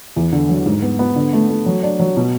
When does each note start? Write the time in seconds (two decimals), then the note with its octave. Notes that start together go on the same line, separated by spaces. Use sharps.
0.16 E2
0.32 D3
0.49 F#3
0.66 G#2
0.82 B3
0.99 B3
1.16 D3
1.33 A3
1.49 A3
1.66 F#3
1.83 D4
2.00 F#3
2.17 B2